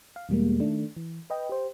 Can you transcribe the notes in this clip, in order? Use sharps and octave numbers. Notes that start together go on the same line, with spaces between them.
F5
E2 B2 G3 G#3 A#3
D#3 A3 D4
E3
B4 D#5 G5
G4 C5